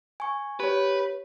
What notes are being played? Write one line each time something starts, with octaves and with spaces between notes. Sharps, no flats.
G#5 C#6
G4 B4 C#5